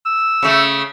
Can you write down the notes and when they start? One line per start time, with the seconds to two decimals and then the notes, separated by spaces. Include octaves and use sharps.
0.06 E6
0.43 C#3 A3